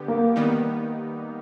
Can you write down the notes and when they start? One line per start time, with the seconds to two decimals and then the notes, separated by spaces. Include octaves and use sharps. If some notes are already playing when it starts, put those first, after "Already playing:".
Already playing: D3 B3 G4
0.08 A#3
0.36 D#3 G3 B3 D#4